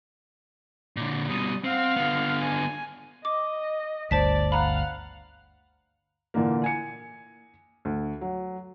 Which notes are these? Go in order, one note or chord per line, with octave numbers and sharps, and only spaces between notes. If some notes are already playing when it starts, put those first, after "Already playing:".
A#2 D3
B2 G3 D#6
C4 F5 F#5
D3 B3
G#5
D#5 D6
G1 D2 C5 D5 A5 B6
F5 F#5 A#5 B5
A#2 D3 E3 A#3
G#5 C#7
D2
F#3